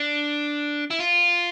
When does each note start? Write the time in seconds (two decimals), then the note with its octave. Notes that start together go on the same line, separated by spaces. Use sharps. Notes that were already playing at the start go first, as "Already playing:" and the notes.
Already playing: D4
0.90 E4
0.99 F4